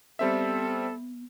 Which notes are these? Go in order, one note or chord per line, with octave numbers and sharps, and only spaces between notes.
G3 B3 C4 A4 E5